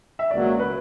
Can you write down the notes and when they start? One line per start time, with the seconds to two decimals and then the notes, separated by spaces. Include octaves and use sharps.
0.19 E5
0.31 C#2 B2 F#3 A#3 D5
0.59 B4